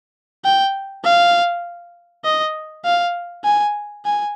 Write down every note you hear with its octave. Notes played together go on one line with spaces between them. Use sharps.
G5
F5
D#5
F5
G#5
G#5